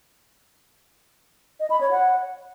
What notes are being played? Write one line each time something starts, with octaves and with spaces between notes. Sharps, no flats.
D#5
B5
C#5
F#5